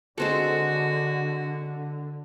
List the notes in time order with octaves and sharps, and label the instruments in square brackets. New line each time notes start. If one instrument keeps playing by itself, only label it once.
[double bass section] D3 [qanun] G#3 C4 A4 [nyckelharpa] F#4